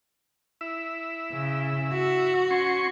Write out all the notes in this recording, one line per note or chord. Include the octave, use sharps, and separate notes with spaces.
E4 E5
C#3
F#4
C#4 C6 C#6